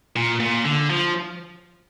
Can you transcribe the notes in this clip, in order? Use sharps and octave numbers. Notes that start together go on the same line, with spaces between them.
A#2
A#2
D3
F3